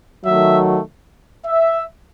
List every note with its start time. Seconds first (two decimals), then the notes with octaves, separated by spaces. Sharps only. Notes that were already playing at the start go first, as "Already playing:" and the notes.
0.24 D#3 F#3 A3 E5
1.46 E5